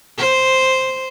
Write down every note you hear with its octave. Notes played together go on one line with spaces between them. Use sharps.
C5